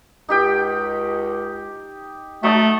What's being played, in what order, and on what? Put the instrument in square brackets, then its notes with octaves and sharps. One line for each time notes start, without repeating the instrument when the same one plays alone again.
[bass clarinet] C#2 [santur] D#4 G4 G5
[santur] F#3 D#4 A5 [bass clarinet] A3